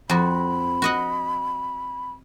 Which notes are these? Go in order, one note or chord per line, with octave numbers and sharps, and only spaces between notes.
F2 F#4 B5
F#4 D#5 F#5